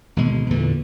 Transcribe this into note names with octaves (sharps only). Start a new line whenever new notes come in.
G#1 D2 B2 G#3
E2 A#2 D3 E3